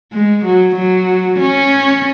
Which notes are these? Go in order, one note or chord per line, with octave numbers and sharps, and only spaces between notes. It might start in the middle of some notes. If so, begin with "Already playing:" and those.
G#3
F#3
F#3
C#4